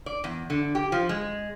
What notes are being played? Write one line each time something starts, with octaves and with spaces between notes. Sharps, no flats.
D5
E2
D3
G4
F3
G#3